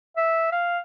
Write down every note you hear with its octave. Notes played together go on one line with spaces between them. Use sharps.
E5
F5